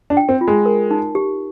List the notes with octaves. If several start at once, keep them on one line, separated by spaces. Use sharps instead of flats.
D4
G5
C4
F4
G#3
A#4
D#4
G4